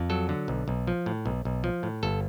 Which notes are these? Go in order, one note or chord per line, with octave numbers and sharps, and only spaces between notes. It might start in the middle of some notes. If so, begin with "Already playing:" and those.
Already playing: F2
F#3 A4
D3
B1
B1
F3
A2
B1
B1
F3
A2
G1 A4